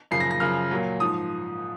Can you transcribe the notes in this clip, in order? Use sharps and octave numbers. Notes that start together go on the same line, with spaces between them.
F#2 C#3 F3 C7
A#6
A#6
F#2 C#3 F3 F6
A#2 F#3
G#2 F3 D#6